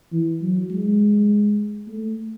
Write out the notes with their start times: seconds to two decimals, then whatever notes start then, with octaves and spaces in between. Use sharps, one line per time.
0.12 E3
0.42 F#3
0.71 G#3
1.88 A3